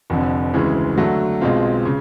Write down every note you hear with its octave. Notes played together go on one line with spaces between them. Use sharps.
F1 F2 D3
D2 C#3 E3 G#3
D3 F#3 A3
B1 B2 G#3 C4 F4
C#3